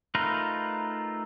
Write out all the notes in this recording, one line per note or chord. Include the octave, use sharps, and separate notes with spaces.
A3 D#4 F4 A#4 B4